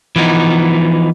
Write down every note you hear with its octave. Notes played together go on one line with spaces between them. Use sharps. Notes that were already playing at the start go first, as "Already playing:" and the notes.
E3 F3 B3 D#4